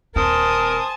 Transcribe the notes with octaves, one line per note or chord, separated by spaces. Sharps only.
D#1 C4 A#4 C5 G#5 A5 D#6